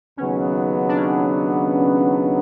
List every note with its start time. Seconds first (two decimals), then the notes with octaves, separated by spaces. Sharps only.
0.17 D#2 C#3 F#3 B3 C#4 D#4
0.89 D4
0.97 C#4